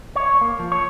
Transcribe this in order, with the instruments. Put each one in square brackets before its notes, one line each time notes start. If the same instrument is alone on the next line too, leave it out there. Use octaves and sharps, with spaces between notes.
[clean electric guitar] C#5
A#3
F3
C#5